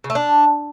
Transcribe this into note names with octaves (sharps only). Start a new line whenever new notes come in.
C#3
A3
D4